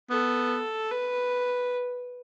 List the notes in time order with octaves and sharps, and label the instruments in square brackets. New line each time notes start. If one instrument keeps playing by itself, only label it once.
[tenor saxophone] B3 [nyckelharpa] A4
[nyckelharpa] B4